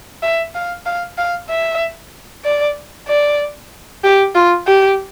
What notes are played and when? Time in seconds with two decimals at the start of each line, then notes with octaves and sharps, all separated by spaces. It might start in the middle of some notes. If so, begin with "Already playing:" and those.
0.23 E5
0.55 F5
0.86 F5
1.18 F5
1.50 E5
2.45 D5
3.08 D5
4.04 G4
4.35 F4
4.67 G4